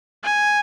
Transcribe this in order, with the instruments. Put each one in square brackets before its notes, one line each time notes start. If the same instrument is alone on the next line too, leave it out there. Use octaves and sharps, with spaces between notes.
[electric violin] G#5